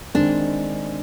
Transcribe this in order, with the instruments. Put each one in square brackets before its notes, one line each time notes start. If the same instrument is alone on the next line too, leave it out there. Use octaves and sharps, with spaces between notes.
[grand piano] D#3 G#3 C4 [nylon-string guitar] D4